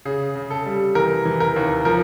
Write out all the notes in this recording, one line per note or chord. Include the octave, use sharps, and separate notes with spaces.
C#3 G#4
C#3
A4
G3
E3 A#4
E3
A#4
D#2
F3 A#4